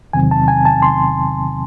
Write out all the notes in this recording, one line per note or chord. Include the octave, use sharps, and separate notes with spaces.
E2 C3 D#3 F#3 C4 G#5
A5
G#5
A5
C6